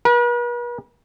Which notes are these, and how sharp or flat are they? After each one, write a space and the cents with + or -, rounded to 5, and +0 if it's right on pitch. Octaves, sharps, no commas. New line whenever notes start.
B4 -45